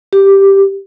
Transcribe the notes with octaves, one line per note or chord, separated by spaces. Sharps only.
G4